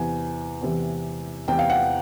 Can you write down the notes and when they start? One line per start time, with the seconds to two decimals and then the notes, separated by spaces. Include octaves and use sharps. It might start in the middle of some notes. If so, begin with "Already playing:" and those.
Already playing: E2 C3 E3 G#5
0.61 E2 C3 E3
1.48 E2 C3 E3 G5
1.59 F5
1.70 F#5